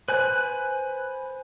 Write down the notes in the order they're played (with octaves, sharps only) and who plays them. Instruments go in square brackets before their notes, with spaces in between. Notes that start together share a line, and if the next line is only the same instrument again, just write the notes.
[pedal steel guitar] B4 G#5 F#6 [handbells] C5